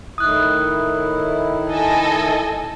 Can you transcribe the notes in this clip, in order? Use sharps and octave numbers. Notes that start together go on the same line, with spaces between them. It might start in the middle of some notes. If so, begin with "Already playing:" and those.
A2 D#3 E4 D#6 F#6
A4 D#5 G#5